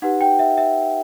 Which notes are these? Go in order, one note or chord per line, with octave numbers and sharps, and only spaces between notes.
D#4 G4 B4 F#5
G5
E5
E5